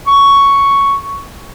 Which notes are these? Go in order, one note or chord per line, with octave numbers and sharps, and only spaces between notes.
C#6